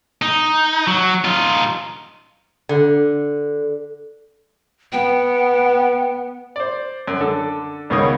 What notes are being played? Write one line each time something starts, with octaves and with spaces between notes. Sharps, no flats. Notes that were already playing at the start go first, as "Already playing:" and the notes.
D#4
F#3
D#4 F4
D3
B3 G5
C5 D5
F#2
D3 A4
C#2 B2 D#3 C#5 D#5